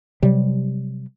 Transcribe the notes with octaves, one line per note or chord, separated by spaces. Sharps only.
C3 F#3 G3